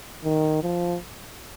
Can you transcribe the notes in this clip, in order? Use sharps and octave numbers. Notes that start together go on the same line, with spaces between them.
D#3
F3